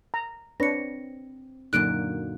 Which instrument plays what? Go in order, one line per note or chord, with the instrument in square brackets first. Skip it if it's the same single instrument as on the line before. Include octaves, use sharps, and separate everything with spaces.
[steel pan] A#5
[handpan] C4 [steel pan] D4 B4 C#5 [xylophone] A#6 C#7
[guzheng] F#2 A#2 D3 [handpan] F#3 A#3 D#4 [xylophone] F#6 D7